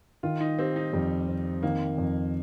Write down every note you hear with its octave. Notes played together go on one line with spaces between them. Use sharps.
D#3 F4
D#4
C4 G4
D#4
F2 G3
C4
D#3 A#3
F2